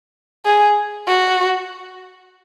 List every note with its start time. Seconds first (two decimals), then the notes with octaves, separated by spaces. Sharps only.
0.45 G#4
1.08 F#4